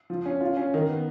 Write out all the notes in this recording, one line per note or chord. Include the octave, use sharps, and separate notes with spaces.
F3
C#4
F4
C#4
D#3
B3